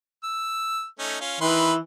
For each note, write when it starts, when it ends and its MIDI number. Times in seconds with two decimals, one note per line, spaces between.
0.24 0.86 88
0.99 1.17 57
0.99 1.17 61
0.99 1.17 63
1.20 1.40 61
1.20 1.40 65
1.41 1.72 51
1.41 1.78 52
1.41 1.72 71
1.41 1.72 84